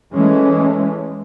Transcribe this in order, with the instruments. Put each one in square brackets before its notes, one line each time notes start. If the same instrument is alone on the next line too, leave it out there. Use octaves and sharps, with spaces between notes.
[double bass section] E3 G#3 A3 C#4